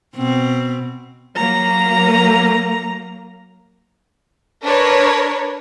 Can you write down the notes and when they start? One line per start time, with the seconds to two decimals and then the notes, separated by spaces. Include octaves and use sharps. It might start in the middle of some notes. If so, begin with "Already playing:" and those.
0.15 B2 C4
1.37 F#3 A#3 A#5
4.64 D4 A#4 B4 C#5